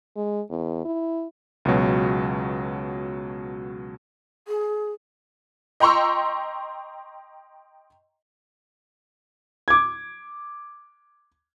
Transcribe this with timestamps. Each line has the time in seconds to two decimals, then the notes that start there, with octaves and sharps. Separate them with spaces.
0.16 G#3
0.50 E2
0.85 E4
1.65 C#2 B2 F#3
4.48 G#4
5.80 D#5 G5 A#5 C6 C#6 E6
9.68 D6 G#6